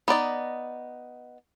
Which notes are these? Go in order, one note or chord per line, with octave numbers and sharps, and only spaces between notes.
B3 D#4 D5 D#5